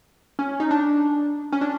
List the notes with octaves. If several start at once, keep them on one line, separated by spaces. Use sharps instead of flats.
C#4
D#4
D4
C#4
D4